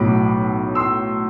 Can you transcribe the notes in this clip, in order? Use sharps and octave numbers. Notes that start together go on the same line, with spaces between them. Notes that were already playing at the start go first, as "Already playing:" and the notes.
Already playing: B1 A2 F#3 B5 D6
C6 E6